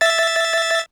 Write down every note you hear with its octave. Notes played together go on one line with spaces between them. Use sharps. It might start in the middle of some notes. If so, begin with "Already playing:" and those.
E5 A6